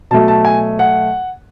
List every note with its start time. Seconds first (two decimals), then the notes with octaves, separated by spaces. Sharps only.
0.11 B2 F#3 A3 A5
0.28 A5
0.45 G#5
0.79 F#5